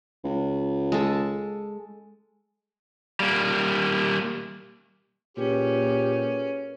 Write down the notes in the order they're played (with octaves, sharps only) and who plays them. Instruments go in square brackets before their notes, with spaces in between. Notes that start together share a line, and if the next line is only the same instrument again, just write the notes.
[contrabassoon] C#2
[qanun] G#3 A4
[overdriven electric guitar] G3 A#3
[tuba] A#2 [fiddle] C#4 [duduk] G4 [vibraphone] G#4 A#4 B4